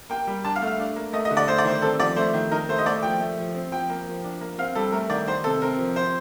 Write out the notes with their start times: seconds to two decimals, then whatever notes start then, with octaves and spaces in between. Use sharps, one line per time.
0.10 A#3 G5
0.27 G3
0.45 D4 A5
0.56 F5
0.62 A3
0.67 F5
0.79 D4
0.96 A#3
1.13 A3 D#5
1.25 D#5
1.31 D3
1.37 D5
1.48 A3 C5
1.58 D5
1.65 D#3 C5
1.82 C4 A4
2.00 F3 D5
2.16 A3 C5
2.34 D#3
2.51 D#4 A#4
2.69 A3 C5
2.79 D#5
2.86 A3 D5
3.03 F3 G5
3.20 A3
3.38 F3
3.54 C4
3.72 F3 G5
3.90 A#3
4.07 F3
4.24 D4
4.41 A#3
4.58 C4 F5
4.75 G3 A4
4.92 A3 A#4
5.10 D#3 D5
5.27 D#3 C5
5.44 C3 A4
5.61 C4 A#4
5.79 F3
5.96 C4 C5